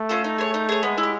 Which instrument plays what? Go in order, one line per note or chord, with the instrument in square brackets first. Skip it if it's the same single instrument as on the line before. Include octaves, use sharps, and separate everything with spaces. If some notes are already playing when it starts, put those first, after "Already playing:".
Already playing: [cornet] A3
[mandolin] C#4 F4 A4
D#4
G#4 C#5
D#4
G#4 C#5
[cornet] G#3 [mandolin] B3
[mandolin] E4
G4